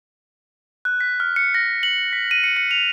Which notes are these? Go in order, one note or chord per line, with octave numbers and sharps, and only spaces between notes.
F#6
B6
F6
C#7
A#6
F#7
B6
D#7
C#7
C#7
F7